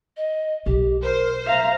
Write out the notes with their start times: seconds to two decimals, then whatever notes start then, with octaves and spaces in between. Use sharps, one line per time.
0.17 D#5
0.66 B1 G4
1.02 A#4 C5
1.46 E5 F5 A#5